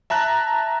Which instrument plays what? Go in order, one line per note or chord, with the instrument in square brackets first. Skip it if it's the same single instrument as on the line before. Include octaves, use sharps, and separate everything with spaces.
[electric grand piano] E5 A5 A#5 F#6